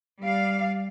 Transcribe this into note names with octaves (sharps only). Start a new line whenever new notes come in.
G3 D5 F5